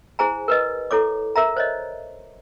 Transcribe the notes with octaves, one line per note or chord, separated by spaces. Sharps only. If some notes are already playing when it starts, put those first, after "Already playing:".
E4 G#4 C5 G#5 A#5
A#4 B4 D#5
E4 A4 C#5 D6
A#4 E5 A#5
C5 C#5 D#5